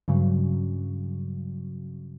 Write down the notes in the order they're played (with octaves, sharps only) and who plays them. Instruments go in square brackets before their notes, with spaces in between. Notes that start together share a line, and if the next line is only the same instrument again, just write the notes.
[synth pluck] G2 C#3 F#3